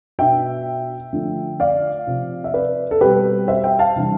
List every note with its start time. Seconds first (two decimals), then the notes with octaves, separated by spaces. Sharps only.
0.19 B2 B3 D4 E5 G5
1.13 D3 F3 A3 D4
1.60 D5 F5
2.07 C3 F3 C4
2.44 E5
2.54 B4 D5
2.91 A4
3.01 B2 G3 C4 G4 B4
3.48 C5 E5
3.64 E5 G5
3.79 F5 A5
3.95 C3 E3 G3 D4